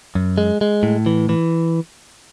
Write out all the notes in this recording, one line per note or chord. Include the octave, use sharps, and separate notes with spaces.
F#2
G#3
G#3
A2
E3
E3